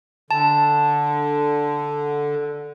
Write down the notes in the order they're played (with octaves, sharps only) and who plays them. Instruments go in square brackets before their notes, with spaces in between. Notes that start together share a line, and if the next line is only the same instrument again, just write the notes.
[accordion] D3 [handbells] A5